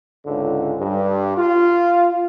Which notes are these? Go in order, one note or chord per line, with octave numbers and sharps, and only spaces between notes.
C#2 G#2 D3
G2
F4